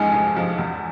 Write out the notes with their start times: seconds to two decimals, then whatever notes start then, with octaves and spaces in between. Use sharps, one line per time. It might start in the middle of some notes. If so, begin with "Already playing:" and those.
Already playing: A1 G#2 F3 G#3 G#5
0.14 A1
0.36 F3
0.58 E2